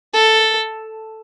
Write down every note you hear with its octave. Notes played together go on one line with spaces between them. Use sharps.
A4